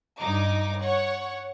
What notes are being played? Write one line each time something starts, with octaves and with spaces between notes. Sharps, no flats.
G2 D#4 D6
C#5 F#5